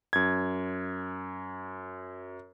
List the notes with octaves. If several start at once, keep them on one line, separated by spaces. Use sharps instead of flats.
F#2 G#6